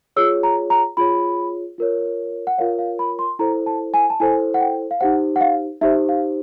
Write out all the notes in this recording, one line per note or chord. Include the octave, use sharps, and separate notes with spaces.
F4 G#4 C#5 E6
A#5
A#5
F4 G#4 C#5 B5
F4 A#4 C#5
F#5
F4 A#4 C#5 F5
F5
B5
C6
E4 A4 C5 A#5
A5
G#5
A5
E4 A4 C5 G#5
F#5
G5
F5
D#4 G4 C5 F#5
F#5
F5
D#4 G4 C5 E5
F5